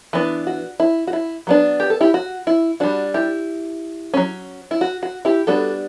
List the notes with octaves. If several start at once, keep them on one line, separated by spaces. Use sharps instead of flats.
E3 B3 D4
F#4
E4
F#4
E4
F#3 B3 D4
G4
A4
E4 G4
F#4
E4
G3 D4 F#4
E4 G4
F#3 C#4
E4
F#4
F#4
E4 G4
G3 B3 D4 F#4 A4